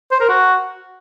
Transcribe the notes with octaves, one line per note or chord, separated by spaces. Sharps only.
C5
A#4
F#4